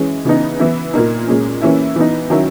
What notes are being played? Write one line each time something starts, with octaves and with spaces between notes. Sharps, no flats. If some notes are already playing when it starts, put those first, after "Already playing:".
Already playing: E3 G#3 C#4
C#3 E3 B3 D#4
E3 B3 E4
A#2 A#3 D#4
A#2 G#3 C#4
E3 A#3 C#4 E4
E3 B3 D#4
D#3 F#3 C#4 E4